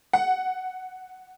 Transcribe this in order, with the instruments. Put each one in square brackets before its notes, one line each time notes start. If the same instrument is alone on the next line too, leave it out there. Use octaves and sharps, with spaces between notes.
[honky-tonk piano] F#5